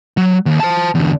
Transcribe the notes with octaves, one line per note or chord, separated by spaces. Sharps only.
F#3
D#2
C5 A5
E2 D3